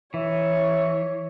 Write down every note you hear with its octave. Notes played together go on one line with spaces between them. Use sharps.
E3 C#5 E5